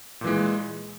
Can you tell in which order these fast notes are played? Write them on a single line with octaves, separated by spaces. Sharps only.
A#2 E3 G#3